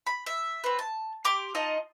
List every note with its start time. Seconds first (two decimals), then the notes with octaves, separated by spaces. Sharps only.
0.07 B5
0.26 E5
0.64 C4 B4
0.79 A5
1.25 G4 C6 D6
1.55 D#4 F4 D#5 A5